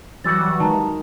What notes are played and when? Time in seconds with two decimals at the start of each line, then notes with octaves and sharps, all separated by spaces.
0.24 E3 F#3 G3 F#4 D6 E6 A6
0.60 D#3 G#3 A5 A#5